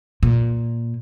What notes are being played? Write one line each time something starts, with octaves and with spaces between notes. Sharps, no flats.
A#2